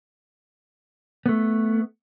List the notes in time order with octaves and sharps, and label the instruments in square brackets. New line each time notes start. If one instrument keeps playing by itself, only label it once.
[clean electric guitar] A3 B3